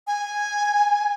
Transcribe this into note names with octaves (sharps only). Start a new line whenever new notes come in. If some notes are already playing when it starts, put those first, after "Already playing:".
G#5